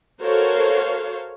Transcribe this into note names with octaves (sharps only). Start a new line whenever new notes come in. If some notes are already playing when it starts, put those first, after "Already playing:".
F#4 A4 A#4 C5 C#5 F5